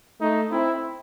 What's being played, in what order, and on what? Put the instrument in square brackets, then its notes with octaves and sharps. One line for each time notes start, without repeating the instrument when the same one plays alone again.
[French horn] A3 [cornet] D#4
[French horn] C4 [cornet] E4